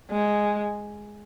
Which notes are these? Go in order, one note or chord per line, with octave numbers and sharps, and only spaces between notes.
G#3